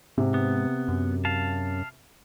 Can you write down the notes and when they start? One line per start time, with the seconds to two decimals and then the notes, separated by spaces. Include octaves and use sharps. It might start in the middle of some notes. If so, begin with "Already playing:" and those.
0.18 G#2 C3
0.34 B3
0.88 F#2
1.25 F5 A5